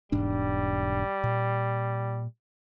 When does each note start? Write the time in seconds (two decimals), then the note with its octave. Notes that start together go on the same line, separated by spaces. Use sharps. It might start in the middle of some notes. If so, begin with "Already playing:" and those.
0.12 E1 G#2 G3 D4
1.24 A#2